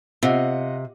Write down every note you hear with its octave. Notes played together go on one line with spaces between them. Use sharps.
C3 F4 D#5 F#5